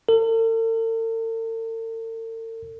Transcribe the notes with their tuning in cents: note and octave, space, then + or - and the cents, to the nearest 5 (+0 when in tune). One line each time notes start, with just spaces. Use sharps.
A4 +45